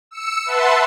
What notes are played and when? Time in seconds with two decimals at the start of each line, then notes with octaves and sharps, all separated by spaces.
0.11 E6 C#7
0.45 B4 E5 F#5 A5 C6